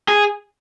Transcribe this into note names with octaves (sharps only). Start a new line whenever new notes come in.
G#4